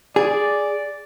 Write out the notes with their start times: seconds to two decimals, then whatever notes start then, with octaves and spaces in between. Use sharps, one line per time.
0.16 G#4 D5